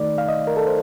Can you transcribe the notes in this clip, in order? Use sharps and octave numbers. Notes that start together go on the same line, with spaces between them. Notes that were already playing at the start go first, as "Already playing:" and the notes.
Already playing: D#3 A3 D#4 D5
F5
D#5
A#4
A4
C5